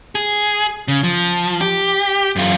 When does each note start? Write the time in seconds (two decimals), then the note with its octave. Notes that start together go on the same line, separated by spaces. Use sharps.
0.15 G#4
0.88 C#3
1.03 F3
1.61 G4
2.36 F#2 F4